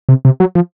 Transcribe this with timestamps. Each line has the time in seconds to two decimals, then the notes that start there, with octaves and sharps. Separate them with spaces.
0.09 C3
0.25 C3
0.40 F#3
0.55 F3